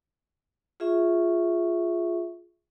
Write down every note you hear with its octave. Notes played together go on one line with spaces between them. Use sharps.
F4 G#4 E5 C#6